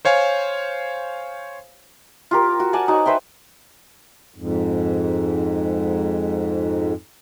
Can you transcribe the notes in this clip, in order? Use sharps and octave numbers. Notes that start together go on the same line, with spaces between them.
C5 C#5 F5 G#5
F4 G4 A#4
F#4
D5 F#5 G#5 A5
D#4 F#4 C#5
B4 C5 E5 G5
F2 G#2